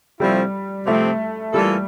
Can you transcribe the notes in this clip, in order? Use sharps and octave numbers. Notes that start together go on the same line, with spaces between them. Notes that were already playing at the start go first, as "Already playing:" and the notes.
C3 F3 G3 A3 C4 E4
C3 F3 A3 C4
E3 G3 A#3 F4 A4